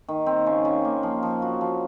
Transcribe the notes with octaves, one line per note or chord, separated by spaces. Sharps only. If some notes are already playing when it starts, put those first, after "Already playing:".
D#3
C4
C#3
C#3
A#3
F3
F3
F#4
F3